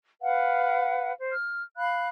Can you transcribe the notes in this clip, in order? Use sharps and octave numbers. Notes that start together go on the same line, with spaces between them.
B4 F5 F#5
C5
F6
F5 B5 F#6